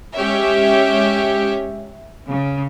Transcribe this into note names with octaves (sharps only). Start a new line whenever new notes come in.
G#3 C#4 G4 C#5 E5
C#3